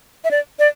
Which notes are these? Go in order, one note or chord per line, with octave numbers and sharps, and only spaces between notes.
E5
D5
D5